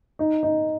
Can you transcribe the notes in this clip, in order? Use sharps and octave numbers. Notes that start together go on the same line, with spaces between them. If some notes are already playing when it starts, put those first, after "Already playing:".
D#4
D#4